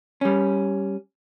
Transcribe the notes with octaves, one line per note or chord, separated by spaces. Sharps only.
G3 C#4